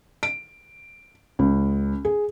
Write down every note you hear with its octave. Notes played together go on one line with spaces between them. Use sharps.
D7
C#2
G#4